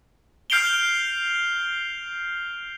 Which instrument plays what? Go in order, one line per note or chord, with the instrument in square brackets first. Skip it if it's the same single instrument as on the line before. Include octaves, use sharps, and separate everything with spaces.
[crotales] F6 G6 C7 D7 F7 G7